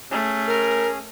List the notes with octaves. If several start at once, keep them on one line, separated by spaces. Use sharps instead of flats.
A3 C#4 G#4
A#4